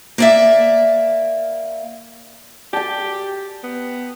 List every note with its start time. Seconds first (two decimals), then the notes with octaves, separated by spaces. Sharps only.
0.18 A#3 D5 E5
2.73 G4 G5 A5
3.64 B3